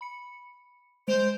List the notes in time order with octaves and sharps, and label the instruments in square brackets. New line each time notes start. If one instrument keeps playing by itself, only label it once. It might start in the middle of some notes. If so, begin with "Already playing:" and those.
[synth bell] B5 C#7
[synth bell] G#3 D7 F7 [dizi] C5